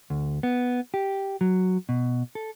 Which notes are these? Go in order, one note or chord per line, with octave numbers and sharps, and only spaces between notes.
D2
B3
G4
F#3
B2
A4